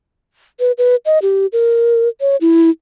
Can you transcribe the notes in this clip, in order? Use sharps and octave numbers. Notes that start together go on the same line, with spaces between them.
B4
B4
D#5
G4
A#4
C#5
E4